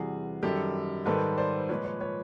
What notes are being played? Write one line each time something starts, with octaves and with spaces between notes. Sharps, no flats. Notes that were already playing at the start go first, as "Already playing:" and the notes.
Already playing: E2 C3 E3 G3 F#4 G#4
F#2 D#3 G3 G4 A4
G#2 D#3 G3 A4 B4
C5 D5
A#2 F3 G#3 B4 C#5
B4 C#5
B4 C#5